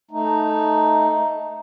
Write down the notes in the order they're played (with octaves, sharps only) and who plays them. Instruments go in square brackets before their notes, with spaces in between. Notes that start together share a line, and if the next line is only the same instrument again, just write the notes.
[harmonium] A3 D#4